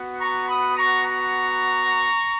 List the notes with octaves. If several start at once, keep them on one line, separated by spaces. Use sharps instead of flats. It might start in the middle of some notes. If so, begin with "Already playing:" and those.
Already playing: B3 F#4
A#5 C#6
B5 D#6
A#5 C#6
A#5 C#6